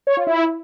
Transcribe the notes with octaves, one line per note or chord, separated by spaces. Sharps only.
C#5
F4
E4